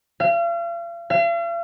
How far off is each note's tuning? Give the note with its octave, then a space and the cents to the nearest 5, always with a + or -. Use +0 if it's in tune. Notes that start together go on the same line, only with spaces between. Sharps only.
F5 -40
F5 -45